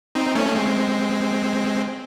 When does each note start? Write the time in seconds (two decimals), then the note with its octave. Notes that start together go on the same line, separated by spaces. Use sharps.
0.15 C4 D#4
0.35 A3 C#4
0.55 G#3 C4